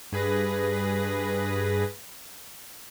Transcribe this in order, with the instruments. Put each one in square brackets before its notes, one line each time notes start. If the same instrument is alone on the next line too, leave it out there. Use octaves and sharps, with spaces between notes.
[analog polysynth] G2 G#4 B4 A#6